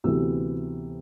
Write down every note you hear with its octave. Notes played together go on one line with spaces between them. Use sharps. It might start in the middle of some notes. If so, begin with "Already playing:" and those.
D2 C3 E3 B3 E6